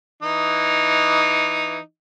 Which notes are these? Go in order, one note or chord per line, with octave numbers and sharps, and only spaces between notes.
E3 D#4